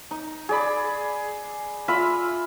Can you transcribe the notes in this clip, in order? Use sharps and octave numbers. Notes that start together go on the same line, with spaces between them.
D#4
G#4 D5 B5
F4 E5 B5